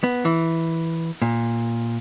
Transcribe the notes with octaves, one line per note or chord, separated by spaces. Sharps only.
B3
E3
A#2